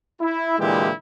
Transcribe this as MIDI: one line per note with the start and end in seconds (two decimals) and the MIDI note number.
0.21 0.59 64
0.59 0.90 46
0.59 0.90 50
0.59 0.90 52
0.59 0.90 56
0.59 0.90 64
0.59 0.90 67